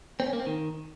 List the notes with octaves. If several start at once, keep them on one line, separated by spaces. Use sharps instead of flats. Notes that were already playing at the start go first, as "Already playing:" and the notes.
C4
C#4
A#3
C4
D#3